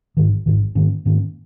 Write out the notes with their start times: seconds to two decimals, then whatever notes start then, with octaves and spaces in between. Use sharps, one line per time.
0.17 G#1 G#2 D#3
0.46 G#1 G#2 D#3
0.75 G#2 D#3 A#3 C#4
1.05 G#2 D#3 A#3 C#4